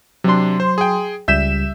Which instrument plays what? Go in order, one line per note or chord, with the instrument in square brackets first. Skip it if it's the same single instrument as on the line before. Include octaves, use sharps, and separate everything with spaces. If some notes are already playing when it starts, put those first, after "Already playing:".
[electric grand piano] C3 D4 [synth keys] F#3 C6
[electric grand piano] C5
G#4 G5
[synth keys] C#2 G3 E7 [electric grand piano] E5 G6 B6